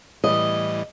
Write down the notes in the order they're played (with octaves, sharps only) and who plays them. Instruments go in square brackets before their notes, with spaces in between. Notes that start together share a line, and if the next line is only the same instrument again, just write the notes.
[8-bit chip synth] A2 E3 G3 [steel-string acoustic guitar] D#5